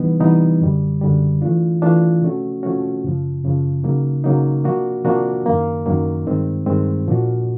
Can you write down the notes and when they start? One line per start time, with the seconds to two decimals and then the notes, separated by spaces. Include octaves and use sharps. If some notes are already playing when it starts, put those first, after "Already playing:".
Already playing: C3 E3 G3 B3 D#4
0.20 C3 E3 G3 B3 D#4
0.61 F#2 D3 G3
1.02 F#2 D3 G3
1.42 E3 A3 D4 F4
1.82 E3 A3 D4 F4
2.22 C3 F3 A3 C#4 F#4
2.63 C3 F3 A3 C#4 F#4
3.03 F#2 C#3 F3
3.44 F#2 C#3 F3
3.83 C#3 F#3 A#3 D#4
4.24 C#3 F#3 A#3 D#4
4.65 C3 F3 A#3 D4 F#4
5.04 C3 F3 A#3 D4 F#4
5.46 F#2 D#3 F#3 A#3
5.86 F#2 D#3 F#3 A#3
6.26 G2 D#3 G#3 C4
6.66 G2 D#3 G#3 C4
7.07 A#2 F3 A#3 D4 F#4